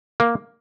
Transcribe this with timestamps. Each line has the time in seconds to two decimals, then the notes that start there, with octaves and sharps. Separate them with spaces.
0.20 A#3